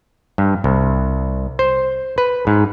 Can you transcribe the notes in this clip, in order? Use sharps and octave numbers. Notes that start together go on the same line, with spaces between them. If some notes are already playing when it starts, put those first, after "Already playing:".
G2
C2
C5
B4
G#2